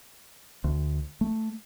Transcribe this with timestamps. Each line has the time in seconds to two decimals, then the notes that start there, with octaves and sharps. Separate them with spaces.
0.64 D2
1.21 A3